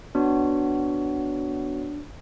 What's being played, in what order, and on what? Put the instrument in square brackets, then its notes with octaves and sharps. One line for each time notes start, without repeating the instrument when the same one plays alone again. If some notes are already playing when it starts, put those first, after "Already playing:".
[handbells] B3 F#4 C#5 [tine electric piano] D4